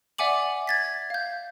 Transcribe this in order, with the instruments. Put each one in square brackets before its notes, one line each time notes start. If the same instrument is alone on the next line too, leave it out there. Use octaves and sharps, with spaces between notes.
[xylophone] D5 E5 F#5 G#5 D6 F#7
G#6 A6 B6
F5 G6